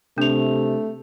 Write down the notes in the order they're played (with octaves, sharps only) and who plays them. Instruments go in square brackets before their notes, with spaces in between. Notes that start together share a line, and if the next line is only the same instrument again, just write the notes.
[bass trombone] C3 [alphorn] A3 [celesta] D4 F7